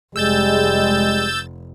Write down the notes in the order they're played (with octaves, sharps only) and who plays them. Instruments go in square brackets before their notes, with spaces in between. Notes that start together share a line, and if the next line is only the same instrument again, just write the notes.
[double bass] F1 [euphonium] G3 [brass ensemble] G#3 [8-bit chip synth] E6 G6 A6